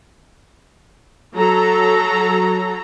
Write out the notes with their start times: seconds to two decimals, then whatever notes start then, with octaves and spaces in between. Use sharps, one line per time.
1.36 F#3 A4 A#5